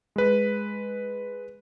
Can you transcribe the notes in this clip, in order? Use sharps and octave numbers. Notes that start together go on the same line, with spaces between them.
G#3 B4